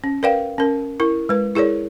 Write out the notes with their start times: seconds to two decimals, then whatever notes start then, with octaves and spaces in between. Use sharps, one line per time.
0.04 C#4
0.23 A#4 B4 D5 F5 G5
0.58 C#4 A#4
1.00 E4 A#4
1.29 G#3 B4
1.55 E4 G#4 A#4 C#5 D5